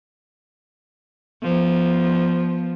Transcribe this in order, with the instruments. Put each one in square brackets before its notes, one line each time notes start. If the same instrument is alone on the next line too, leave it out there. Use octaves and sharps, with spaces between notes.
[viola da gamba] F3 B3